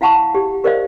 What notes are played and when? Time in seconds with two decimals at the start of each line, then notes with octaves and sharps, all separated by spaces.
0.01 E4 F5 F#5 A5 C#6
0.35 G4
0.64 G4 A#4 C5 D5 D#5 F5